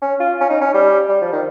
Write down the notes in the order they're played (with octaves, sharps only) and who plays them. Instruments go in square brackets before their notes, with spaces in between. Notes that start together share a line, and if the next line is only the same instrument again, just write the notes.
[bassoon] C#4
F4
C#4
D#4
C#4
G3
G3
F3
D#3